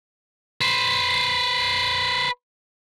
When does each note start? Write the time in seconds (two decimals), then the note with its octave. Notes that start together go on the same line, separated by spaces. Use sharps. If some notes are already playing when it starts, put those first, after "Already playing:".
0.61 B4 C5